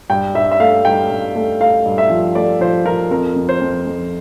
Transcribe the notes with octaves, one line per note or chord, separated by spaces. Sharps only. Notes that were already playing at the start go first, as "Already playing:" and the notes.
G2 G5
G2 E5
E5
A3 F5
G2 G5
G2
A3
A3 F5
G2
E5
F3
A3 D5
F3 C5
F3 A#4
F2 A#4
F2
C5
F2
F2